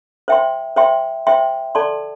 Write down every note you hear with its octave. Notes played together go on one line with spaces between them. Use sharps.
C5 E5 G5 C6
C5 E5 G5 C6
C5 E5 G5 C6
A4 D5 A5 C6